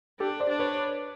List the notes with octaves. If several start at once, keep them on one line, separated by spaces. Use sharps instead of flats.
D4 G4 A4
C5 D5
D4
B4 C#5